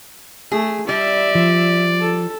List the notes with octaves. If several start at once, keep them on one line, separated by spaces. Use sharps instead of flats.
A3 G#4
G3 D5 E5
F3
A4